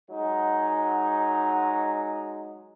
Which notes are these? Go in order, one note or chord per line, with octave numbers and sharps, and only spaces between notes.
F#3 G#3 D#4